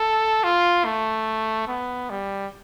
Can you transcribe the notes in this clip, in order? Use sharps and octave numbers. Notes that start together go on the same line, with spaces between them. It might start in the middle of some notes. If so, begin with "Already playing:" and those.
Already playing: A4
F4
A3
B3
G3